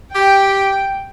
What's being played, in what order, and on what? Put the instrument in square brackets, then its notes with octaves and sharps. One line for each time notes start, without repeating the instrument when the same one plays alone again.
[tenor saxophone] G4 [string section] G5